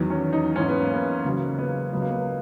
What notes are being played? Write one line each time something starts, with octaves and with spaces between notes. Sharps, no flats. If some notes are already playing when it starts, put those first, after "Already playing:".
Already playing: E2 D#3 F#3
C#4
D#4
G#2 E3 C#4
B3
A#3
B3
C#2 C#3 F#3 A#3
B3
C#2 C#3 F#3 B3
A#3
B3